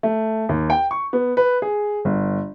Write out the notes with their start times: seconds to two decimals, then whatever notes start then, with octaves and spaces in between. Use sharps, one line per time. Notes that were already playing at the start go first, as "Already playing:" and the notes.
0.03 A3
0.49 D#2
0.70 G5
0.91 C#6
1.13 B3
1.37 B4
1.62 G#4
2.05 G1